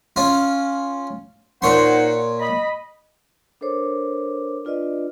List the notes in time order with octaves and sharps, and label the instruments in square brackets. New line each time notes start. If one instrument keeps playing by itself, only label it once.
[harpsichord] C#4 F4
[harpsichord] A#2 C#5 C6 [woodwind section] D#4 C5 F#5
[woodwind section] D#5 B5
[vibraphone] D4 A4 A#4 C5 C#5 D6
D4 F4 B4 D5 D#5